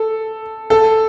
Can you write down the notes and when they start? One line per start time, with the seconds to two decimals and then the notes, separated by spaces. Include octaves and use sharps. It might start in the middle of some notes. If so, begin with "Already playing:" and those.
Already playing: A4
0.70 A4